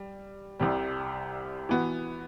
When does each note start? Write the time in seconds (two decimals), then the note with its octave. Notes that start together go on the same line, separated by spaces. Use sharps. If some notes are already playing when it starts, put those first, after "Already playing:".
Already playing: G3
0.60 C2 C3 G3
1.69 E3 B3 F#4